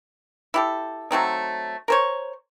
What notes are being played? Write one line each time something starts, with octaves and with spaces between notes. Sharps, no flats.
E4 G4 A4
F#3 A3 C4 D#4
A#4 C5 C#5